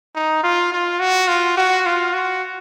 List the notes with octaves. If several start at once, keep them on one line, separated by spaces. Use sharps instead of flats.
D#4
F4
F4
F#4
F4
F#4
F4
F#4